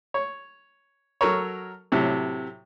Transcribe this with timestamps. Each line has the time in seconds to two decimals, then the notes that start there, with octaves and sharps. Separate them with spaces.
0.14 C#5
1.21 F#3 A4 A#4 C#5
1.92 A2 C3 F#3